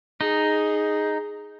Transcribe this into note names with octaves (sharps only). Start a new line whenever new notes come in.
D#4 G#4